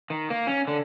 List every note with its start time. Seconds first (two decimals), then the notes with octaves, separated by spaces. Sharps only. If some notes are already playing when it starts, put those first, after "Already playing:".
0.10 D#3
0.30 A#3
0.47 C#4
0.68 D3